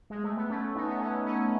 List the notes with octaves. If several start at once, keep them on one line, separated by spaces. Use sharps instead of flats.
G#3
A3
B3
A3 C#4
B3 D#4
B3
A3 C#4
A3 C#4